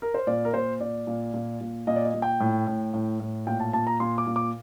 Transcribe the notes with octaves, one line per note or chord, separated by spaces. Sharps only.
A#4
C5
A#2 D5
A#4
A#2 C5
A#2 D5
A#2
A#2
A#2
A#2 D#5
D5
D#5
A#2
G5
A2
A2
A2
A2
A#2 G5
A5
A#2 A5
A#5
A#2 C6
D6
A#2
D6